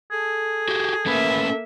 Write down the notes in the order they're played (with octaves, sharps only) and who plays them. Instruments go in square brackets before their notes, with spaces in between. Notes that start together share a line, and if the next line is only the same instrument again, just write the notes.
[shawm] G#4 [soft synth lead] A4
[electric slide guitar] F#4 G4
[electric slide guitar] A3 C#4 B4 [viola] A#3 E5